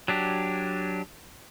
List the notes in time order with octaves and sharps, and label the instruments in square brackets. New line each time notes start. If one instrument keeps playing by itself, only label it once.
[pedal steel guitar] F#3 D4 G4